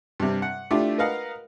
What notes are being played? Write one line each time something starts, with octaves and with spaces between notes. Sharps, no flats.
G2 C3
F#5
A3 D4 E4 F4 G4
A#4 B4 D#5 F5 F#5